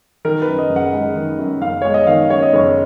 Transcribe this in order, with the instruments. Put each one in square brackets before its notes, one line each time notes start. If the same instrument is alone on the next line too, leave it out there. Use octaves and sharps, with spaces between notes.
[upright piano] D#3 A#4
B4
F#2
D#5
F#1
F#5
G#3
D#3
F#2
F#1 F5
G#3 C#5
D#5
D#3 F5
F#2 C#5
D#5
F#1 C#5